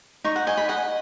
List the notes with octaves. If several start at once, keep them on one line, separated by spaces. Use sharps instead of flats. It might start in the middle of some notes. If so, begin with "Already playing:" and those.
D#4 C#6
F#5
D#5 G#5
B5
D#5 F#5